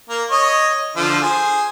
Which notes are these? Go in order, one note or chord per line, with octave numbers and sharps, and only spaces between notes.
A#3 A#5
C#5 D#5
D3 F3 F4
G#4 C5